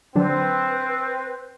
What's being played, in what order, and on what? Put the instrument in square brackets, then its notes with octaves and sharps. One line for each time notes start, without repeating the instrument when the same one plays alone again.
[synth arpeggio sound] D3 F#3 D4 [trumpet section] C4 [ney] B4